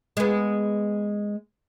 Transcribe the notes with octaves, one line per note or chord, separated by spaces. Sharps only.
G#3 B3